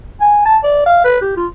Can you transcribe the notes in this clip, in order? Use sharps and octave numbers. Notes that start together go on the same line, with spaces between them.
G#5
A5
D5
F5
B4
G4
F4